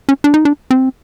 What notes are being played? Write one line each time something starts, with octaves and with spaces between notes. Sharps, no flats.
C#4
D4
D#4
D4
C4